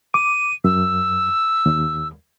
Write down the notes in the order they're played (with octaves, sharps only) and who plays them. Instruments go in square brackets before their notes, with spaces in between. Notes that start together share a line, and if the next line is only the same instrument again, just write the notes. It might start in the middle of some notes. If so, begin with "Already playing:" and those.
[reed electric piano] D6 [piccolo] D#7
[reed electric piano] F#2 [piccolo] E6
[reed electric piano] D#2